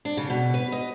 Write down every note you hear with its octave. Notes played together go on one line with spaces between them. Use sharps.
D4
C#3
B2
B4
D#5